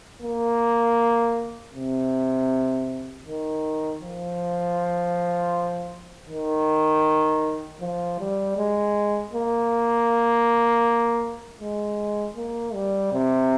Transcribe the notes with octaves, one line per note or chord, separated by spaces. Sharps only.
A#3
C3
D#3
F3
D#3
F3
G3
G#3
A#3
G#3
A#3
G3
C3